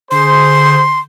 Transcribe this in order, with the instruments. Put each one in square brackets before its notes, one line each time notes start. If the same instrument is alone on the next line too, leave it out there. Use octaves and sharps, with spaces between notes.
[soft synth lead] D3 [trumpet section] G#4 C5 [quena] C6